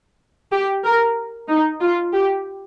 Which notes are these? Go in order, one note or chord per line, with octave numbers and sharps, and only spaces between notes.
G4
A#4
D#4
F4
G4